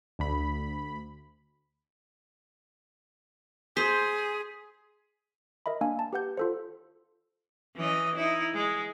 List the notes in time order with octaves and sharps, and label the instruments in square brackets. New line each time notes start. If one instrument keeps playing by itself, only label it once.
[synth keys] D2 B5
[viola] G#4 [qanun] C5 [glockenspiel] B6
[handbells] A#4 D#5 E5 B5
A#3 D4 F5 G#5
A5
G4 B4 F#5 G6
F4 A4 C5
[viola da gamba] E3 C#4 D#5
D#4 E4
G#3